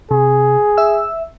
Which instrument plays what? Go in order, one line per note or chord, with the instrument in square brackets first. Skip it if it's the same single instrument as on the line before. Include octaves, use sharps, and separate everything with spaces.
[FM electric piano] C3 [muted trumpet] G#4
[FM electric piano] E5 E6